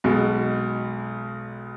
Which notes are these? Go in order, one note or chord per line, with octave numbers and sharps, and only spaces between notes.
B1 B2 G#3